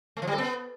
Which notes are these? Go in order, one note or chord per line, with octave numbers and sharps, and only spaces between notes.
A3
F3
G3
A4
B3